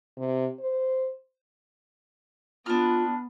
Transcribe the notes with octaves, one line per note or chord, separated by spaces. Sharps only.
C3
C5
B3 D4 F4 F6